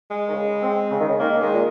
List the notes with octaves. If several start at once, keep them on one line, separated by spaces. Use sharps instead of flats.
G#3
D#3
C#3
C4
C#3
D#3
C#3
D#3 A#3
D#3 G#3
A#2